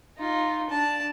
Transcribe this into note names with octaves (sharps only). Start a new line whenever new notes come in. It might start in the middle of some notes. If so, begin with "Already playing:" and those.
D#4 F4
D4 A5